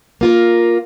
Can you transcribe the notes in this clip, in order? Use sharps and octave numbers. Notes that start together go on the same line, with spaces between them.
A#3 F4 A#4